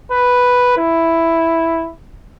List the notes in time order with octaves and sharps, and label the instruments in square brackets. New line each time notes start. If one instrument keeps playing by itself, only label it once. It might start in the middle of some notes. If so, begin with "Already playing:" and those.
[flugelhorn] B4
E4